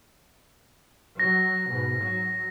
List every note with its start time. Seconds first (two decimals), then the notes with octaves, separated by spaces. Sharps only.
1.20 F#3 A#6
1.70 G#2 B2
2.02 F#3